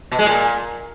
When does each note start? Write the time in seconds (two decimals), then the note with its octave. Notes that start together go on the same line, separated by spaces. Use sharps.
0.12 B2
0.19 G#3
0.26 A#2